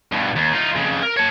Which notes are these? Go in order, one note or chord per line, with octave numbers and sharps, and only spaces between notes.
G2 B2
D#2
D#4 F4
F2 C#3
A#4
C#5 A5